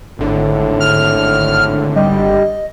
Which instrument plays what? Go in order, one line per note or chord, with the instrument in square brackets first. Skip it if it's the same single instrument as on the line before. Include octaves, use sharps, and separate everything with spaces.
[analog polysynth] G#1 D3 [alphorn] A2
[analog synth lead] F6
[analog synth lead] G3 [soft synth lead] D#5